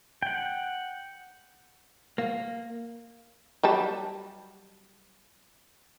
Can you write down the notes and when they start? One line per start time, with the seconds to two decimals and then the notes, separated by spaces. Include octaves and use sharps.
0.22 F#5 G5
2.18 A#3
3.63 F#3 G3 A5